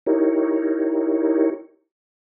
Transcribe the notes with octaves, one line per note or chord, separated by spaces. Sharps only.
D#4 E4 G4 A#4 C#5